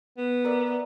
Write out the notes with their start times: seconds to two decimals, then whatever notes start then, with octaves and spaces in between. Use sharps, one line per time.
0.18 B3
0.44 A#4 D5 E5